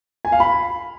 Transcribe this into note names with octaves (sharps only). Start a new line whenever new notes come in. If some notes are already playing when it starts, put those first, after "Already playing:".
G#5
F5
B5